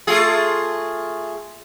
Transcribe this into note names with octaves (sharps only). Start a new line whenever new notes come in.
A3 F4 G#4